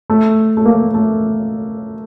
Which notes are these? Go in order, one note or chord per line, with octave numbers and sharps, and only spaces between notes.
A3
A3
A#3
A3